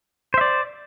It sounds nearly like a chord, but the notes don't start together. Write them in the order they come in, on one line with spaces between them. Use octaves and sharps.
C5 E5 D5